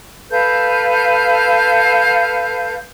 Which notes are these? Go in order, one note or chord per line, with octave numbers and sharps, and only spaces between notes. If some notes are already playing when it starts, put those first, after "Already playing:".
A4 B4 F5 G6